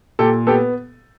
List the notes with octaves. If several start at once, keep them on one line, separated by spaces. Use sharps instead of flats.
A#2 G4 A4
B3 G4 A4